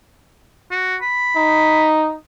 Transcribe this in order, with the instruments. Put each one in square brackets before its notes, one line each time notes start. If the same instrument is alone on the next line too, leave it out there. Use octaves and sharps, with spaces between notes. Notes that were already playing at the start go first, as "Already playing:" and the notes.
[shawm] F#4
B5
[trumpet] D#4